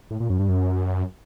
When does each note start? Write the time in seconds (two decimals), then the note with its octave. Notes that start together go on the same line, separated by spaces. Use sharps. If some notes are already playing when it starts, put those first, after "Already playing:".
0.11 A2
0.20 A#2
0.30 F#2
0.39 G2
0.49 F#2